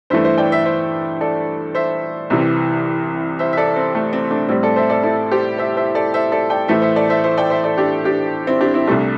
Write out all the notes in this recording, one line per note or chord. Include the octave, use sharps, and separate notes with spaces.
G2 E3 A3 C5 E5
C5 E5
D5 G5
C5 E5
C5 E5
A4 D5
C5 E5
C2 C3 E3
C5 E5
E5
A4 D5
C4
A3
C4
A3 D4
A2 G3 C4
A4 D5
C5 E5
A4 D5
E4 A4
G4 C5
C5 E5
C5 E5
A4 D5
C5 E5
A4 D5
D5 G5
A2 E3 A3 C5 E5
C5 E5
A4 D5
C5 E5
C5 E5
D5 G5
C5 E5
A4 D5
D4 G4
D4 G4
C4 E4
D4 G4
C4 E4
C2 C3 G3 A3 D4